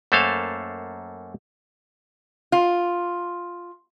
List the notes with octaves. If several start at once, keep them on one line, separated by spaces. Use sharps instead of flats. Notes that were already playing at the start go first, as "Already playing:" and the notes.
F#2 A3 A#3 A4 C5 F5
F4